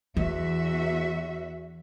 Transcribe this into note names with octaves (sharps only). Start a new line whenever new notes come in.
E2 E3 F#4 E5